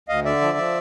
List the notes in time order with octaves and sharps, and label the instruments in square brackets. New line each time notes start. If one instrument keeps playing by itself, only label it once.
[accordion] D2 D#5 F5
D3 D5 E5
F3
F3